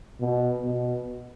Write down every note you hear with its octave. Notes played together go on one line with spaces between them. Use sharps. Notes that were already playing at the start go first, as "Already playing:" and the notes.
B2
B2